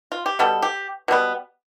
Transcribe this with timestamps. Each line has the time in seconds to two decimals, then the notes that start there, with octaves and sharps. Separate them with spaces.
0.12 F4
0.26 G4
0.39 B2 G3 B3 A4
0.62 G4
1.08 B2 G3 B3